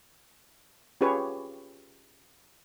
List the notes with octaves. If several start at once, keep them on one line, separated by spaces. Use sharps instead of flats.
C#4 F4 G4 G#4 B4 C#5